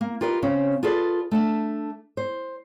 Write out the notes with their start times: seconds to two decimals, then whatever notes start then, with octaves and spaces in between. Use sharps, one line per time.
0.01 A#3
0.21 F4 G4 A#4 B4 D#5
0.42 C#3 C4 C#4
0.83 F4 G#4 A4 B4 D5
1.31 A3 D4 E5
2.17 C5